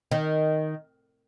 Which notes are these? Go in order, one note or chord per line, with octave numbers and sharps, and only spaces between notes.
D#3